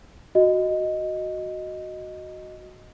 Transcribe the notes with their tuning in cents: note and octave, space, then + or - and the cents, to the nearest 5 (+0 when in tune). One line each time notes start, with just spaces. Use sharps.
F#4 +0 D#5 +0